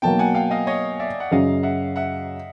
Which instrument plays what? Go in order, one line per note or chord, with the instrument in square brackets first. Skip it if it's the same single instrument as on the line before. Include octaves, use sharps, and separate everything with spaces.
[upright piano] B2 F#3 A#3 [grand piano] G5 A5
[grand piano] F#5 G#5
F5 G5
D#5 F5
C#5 D#5
D5 E5
F#5
[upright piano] F#2 C#3 F#3 [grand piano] D#5 F5
[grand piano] E5 F#5
E5 F#5